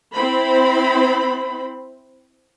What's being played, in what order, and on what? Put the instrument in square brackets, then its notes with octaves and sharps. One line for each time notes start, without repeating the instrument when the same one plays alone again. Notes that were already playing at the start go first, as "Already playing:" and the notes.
[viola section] C4 E4 C5 B5